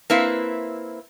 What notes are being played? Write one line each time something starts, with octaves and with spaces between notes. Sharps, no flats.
A#3 C4 E4 B4 E5